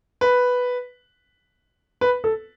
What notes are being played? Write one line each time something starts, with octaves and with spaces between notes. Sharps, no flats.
B4
B4
A4